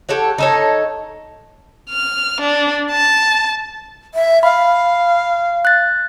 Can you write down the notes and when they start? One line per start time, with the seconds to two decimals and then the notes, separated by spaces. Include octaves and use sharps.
0.09 G4 A4 C#5 F#5
0.38 D#4 A4 C#5
1.90 F6
2.41 D4
2.92 A5
4.14 E5
4.43 F5 B5
5.65 F#6 A6